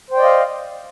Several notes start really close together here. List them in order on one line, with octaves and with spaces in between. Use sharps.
C5 G5 D5 D#5 F5